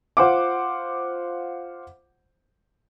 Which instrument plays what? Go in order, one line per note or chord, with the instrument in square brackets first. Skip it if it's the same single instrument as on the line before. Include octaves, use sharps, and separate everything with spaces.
[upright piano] F4 C5 F#5 D6